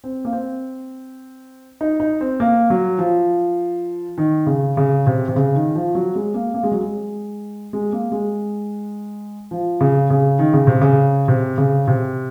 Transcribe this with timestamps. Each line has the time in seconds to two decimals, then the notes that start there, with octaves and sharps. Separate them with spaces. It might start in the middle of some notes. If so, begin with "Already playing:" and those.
0.04 C4
0.25 A#3
0.33 C4
1.81 D#4
2.00 D#4
2.21 C4
2.40 A#3
2.70 F#3
2.99 F3
4.18 D#3
4.47 C#3
4.77 C#3
5.07 C3
5.28 C3
5.36 C#3
5.55 D#3
5.75 F3
5.95 F#3
6.16 G#3
6.34 A#3
6.54 A#3
6.63 G#3
6.72 F#3
6.80 G#3
7.73 G#3
7.93 A#3
8.12 G#3
9.51 F3
9.81 C#3
10.10 C#3
10.39 D#3
10.54 C#3
10.67 C3
10.82 C#3
11.28 C3
11.58 C#3
11.88 C3